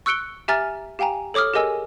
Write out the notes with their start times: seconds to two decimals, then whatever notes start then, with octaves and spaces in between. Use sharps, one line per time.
0.06 C#6 E6 F#6 C#7 D7 G7
0.48 G4 E5 G#5 A#5 F6 A6
0.99 G4 F5 G5 G#5 A#5
1.34 A4 C#5 D6 D#6 F6
1.54 G4 G#4 A#4 D#5 G#5 E6